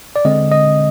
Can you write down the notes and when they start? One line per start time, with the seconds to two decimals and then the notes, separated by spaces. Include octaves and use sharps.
0.16 D5
0.25 D3 G#3 C4 D#5
0.52 D#5